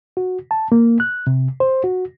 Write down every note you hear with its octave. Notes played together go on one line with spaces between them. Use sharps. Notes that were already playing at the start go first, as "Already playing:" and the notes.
F#4
A5
A#3
F#6
C3
C5
F#4